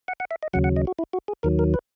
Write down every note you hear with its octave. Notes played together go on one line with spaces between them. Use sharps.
F#5
F#5
E5
D#5
D#2 C#3 F#3 F#5
F#5
D#5
F#4
E4
F#4
G#4
D#2 D#3 F#3 A#4
A#4
B4